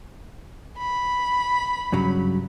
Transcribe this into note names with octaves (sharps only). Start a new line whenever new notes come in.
B5
G2 C#3 F#3